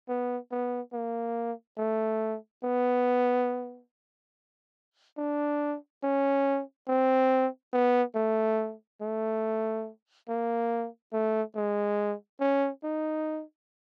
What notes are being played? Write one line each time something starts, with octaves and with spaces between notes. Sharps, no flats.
B3
B3
A#3
A3
B3
D4
C#4
C4
B3
A3
A3
A#3
A3
G#3
C#4
D#4